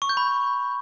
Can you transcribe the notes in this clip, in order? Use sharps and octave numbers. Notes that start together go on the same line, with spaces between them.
C#6
G6
B5